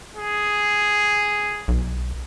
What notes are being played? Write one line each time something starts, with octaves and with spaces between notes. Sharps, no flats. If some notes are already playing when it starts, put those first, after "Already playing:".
G#4
B1